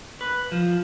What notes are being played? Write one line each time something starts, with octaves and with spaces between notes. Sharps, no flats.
B4
F3